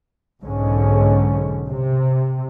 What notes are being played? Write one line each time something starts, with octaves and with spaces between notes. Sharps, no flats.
B1 G#2 D3 C#4
C3